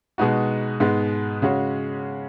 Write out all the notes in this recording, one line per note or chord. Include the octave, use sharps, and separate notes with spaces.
B2 G#3 B3 D#4 F#4
G#2 G#3 B3
C#3 G#3 C#4 F#4